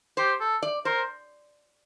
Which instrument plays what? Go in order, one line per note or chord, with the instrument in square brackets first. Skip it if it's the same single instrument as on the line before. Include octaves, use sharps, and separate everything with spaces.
[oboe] G4 [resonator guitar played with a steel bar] C5
[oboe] A4
[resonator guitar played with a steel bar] D5
[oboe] A#4 [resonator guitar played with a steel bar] C5